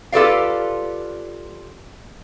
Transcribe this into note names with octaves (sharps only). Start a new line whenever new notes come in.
F4 G4 A4 B4 D5 F5